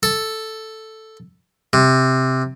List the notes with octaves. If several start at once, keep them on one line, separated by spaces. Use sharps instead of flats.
A4
C3